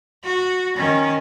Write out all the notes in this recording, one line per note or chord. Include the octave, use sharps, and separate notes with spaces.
F#4
D#3 C#4